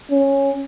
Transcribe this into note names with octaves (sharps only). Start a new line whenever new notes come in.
C#4